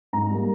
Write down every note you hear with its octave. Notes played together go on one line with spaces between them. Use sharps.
G#2 A#5
G3 A#3